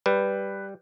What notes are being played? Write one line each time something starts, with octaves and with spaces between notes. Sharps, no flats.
G3 B4